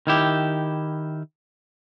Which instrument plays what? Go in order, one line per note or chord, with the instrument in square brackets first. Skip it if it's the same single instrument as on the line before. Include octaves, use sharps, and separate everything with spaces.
[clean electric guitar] D#3 E4 G4